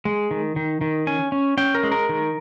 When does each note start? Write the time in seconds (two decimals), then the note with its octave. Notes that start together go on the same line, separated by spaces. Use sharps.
0.05 G#3
0.31 D#3
0.56 D#3
0.81 D#3
1.07 C#4 G#5
1.32 C#4
1.57 C#4 G5
1.75 A#4
1.83 G#3
1.91 A#4
2.09 D#3